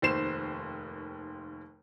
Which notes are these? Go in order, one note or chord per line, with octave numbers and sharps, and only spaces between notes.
F1 D#2 C5 C7 E7